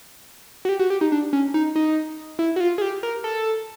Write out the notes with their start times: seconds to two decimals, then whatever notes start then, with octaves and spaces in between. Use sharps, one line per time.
0.65 F#4
0.69 G4
0.79 F#4
0.90 G4
1.01 D#4
1.12 D4
1.33 C#4
1.54 D#4
1.76 D#4
2.39 E4
2.56 F#4
2.60 F4
2.78 G#4
2.81 G4
3.03 A#4
3.24 A4